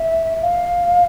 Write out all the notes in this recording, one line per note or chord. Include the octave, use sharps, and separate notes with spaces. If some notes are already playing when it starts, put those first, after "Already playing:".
Already playing: E5
F5